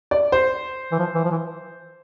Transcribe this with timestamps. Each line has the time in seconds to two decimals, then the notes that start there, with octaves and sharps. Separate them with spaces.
0.11 D5
0.32 C5
0.92 E3
0.99 F3
1.15 E3
1.25 F3
1.31 E3